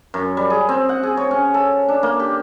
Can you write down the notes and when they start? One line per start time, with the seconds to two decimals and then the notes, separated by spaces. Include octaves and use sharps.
0.14 F#2
0.37 G3
0.50 G#4
0.69 C4
0.89 F#5
1.03 G#4
1.17 C#5
1.31 C#4
1.54 A4
1.88 D4
2.03 A#3
2.19 G4